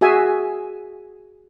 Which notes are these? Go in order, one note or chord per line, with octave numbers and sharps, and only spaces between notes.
F#4 G#4 E5 G#5